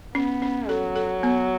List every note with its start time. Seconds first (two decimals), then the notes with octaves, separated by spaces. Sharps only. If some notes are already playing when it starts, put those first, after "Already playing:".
0.15 B3 C#4
0.42 C#4
0.69 F#3 A4
0.96 A4
1.23 B3